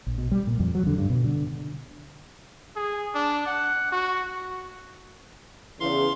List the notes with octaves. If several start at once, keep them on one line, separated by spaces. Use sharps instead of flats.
A#1
B2
G3
A#2
F2
F#3
D3
G2
B2
D3
G#4
D4
F#5
F#4
E2 C#3 F5 C6